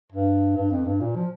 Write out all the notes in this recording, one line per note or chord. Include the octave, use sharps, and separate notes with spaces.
G2
G2
F2
G2
A#2
F3